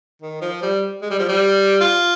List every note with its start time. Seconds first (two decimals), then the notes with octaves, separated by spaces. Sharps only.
0.22 D#3
0.41 F3
0.62 G3
1.02 G#3
1.10 G3
1.19 F3
1.28 G3
1.81 F4